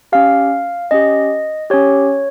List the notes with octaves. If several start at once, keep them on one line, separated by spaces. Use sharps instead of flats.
C#4 G4 F5
C#4 G4 D#5
C#4 G4 C#5